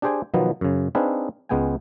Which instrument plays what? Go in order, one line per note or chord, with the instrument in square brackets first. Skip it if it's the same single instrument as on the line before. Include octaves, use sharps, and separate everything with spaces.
[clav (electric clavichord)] D4 G4 G#4 C5 G5 G#5
B2 D#3 F3 F#3 B3
F#2 C#3
C4 D4 D#4 G#4 B4 F5
C#2 G#3 B3 G5 G#5